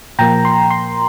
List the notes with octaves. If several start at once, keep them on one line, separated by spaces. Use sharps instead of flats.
A#2 F3 A#3 G5 A#5
C6
C6